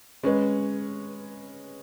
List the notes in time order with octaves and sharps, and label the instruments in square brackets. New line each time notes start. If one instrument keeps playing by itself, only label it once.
[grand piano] G#3 C#4 B4